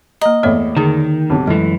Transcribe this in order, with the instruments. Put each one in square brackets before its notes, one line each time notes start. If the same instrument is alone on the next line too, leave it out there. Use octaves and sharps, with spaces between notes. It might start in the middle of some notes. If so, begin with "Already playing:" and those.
[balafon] A#3 A#5 [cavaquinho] D#5
[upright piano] E2 A2 [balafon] A#3 C#5 E5
[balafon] D3 G#4 [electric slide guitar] D#3
[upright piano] B1 C3
[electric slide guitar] F#2 E3 [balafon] G#3 [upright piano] A3